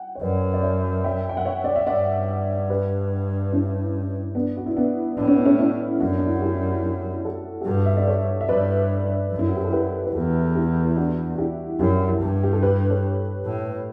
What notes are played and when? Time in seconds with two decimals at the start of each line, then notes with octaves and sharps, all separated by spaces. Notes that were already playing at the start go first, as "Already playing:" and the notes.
Already playing: F#5 G5
0.15 C#5
0.21 F#2 B4 D5
0.54 D5
0.63 C#5 E5
1.04 E5 G5
1.29 G5
1.37 F#5
1.45 C#5 E5
1.64 D5
1.76 E5
1.87 G2 D5 F#5
2.70 G4 B4
3.52 C#4 E4
4.35 B3 D4
4.57 F#4
4.66 E4
4.77 B3 D4
5.17 A2 D4
5.28 C#4
5.37 B3
5.45 A3 C#4
5.59 C#4 E4
6.00 F#2 D4 F#4
6.18 D4
6.26 E4
6.34 F#4
6.42 E4 G4
6.83 E4 G4
7.25 F#4 A4
7.61 G4
7.65 G2 F#4 A4
7.86 E5
7.97 D5
8.07 A4 C#5
8.41 E5
8.49 G2 B4 D5
9.32 F#2
9.39 E4
9.47 F#4
9.56 G4
9.64 A4
9.73 G4 B4
10.06 B4
10.14 E2 F#4 A4
10.55 E4 G4
10.96 D4 F#4
11.34 F#4
11.38 E4 G4
11.79 F#2 E4 G4
12.21 G2
12.43 G4
12.53 A4
12.62 G4 B4
12.90 A4 C#5
13.45 A2